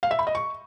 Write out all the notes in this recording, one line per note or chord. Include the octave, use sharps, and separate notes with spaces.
F5
E5
B5
D#5
C#6